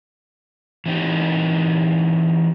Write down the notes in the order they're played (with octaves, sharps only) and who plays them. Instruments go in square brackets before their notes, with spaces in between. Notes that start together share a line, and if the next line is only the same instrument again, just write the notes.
[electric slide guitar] E3 C4 D#4 G4